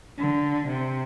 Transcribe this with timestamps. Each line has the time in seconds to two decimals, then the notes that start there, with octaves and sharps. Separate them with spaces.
0.18 D3
0.66 C3